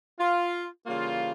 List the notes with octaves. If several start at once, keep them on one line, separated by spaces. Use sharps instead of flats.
F4
C#3 E3 G3 A#3 F4